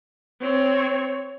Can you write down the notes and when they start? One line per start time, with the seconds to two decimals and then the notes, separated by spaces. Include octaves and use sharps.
0.41 C4 C#5